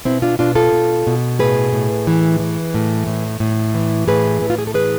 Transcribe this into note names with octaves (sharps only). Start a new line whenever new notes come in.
B2 C4 E4
D4 F4
B2 D4 F4
F4 A4
B2
B2
A2 G#4 B4
A2
E3
E3
A2
A2
A2
E3
A2 G#4 B4
A2 E4
F4
G#4
A4
E3 G#4 B4